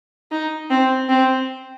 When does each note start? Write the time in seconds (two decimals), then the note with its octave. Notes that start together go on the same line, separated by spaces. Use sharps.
0.31 D#4
0.70 C4
1.09 C4